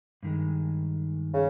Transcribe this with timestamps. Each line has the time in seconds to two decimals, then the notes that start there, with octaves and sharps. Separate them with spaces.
0.23 G2 D#3 G#3
1.34 C#3